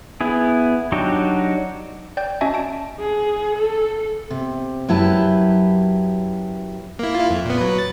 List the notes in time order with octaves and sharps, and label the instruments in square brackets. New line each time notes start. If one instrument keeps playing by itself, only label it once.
[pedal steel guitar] B3 E4 G#4
F#3 D4 D#4 F#4 G4
[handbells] D5 G5 G6
C#4 F#4 D#5 E5 G#5 A5
A5 D7
[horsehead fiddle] G#4
A4
[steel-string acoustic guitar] C3
F#2 F#3 E4 G4 B4 A5
[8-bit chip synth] A#3 E4
E4 F4
F2
A#2 B3
F#3 B4
A6